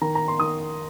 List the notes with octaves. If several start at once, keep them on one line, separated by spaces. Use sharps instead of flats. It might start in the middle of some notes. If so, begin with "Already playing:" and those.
D#3 A#5
A#5
C6
D#3 D#6